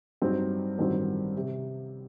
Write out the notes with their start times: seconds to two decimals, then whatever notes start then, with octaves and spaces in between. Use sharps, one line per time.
0.22 G2 F#3 C4 D#4
0.78 A1 G2 D#3 F#3 C4
1.37 C3